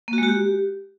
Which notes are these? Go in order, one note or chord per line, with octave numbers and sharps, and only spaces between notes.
A#3
F#4
G#3
F#4
G4